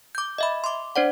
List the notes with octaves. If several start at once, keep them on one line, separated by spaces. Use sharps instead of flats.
D6 G6
D#5 E5 B5
C6 D6
D4 C5 D5 F#5